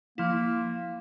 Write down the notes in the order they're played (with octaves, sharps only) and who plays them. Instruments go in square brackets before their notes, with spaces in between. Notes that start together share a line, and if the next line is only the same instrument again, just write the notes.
[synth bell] F3 E4 [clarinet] A#3